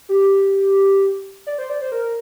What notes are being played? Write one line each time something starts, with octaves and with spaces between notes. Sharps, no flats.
G4
D5
C5
D5
C5
A#4